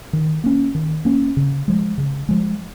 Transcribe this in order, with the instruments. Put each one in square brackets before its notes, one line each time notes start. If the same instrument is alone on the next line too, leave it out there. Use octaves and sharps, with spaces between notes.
[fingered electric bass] D#3
A#3 C#4
D#3
A#3 C#4
C#3
F3 G#3
C#3
F3 G#3